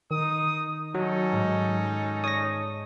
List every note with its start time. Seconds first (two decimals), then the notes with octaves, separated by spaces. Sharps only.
0.11 D#3 D#4 D#6
0.95 F#3 C#4 D#4 A4
1.32 G#2
2.24 C#5 D#6 A#6